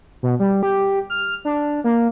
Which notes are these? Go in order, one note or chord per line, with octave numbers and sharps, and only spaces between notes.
B2
G3
G4
F6
D4
A#3